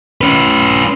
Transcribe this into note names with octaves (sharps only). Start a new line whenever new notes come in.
C#4 B4